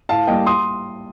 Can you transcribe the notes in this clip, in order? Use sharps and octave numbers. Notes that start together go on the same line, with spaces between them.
A2 F5 A5
G3 A#3 D#5 G5
C6 D#6